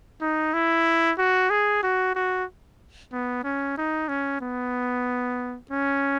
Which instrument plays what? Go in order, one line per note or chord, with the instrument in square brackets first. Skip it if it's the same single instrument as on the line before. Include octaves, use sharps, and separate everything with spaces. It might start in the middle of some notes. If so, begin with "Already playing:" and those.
[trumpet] D#4
E4
F#4
G#4
F#4
F#4
B3
C#4
D#4
C#4
B3
C#4